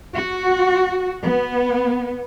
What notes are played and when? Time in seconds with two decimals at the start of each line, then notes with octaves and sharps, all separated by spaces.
0.14 F#4
1.24 B3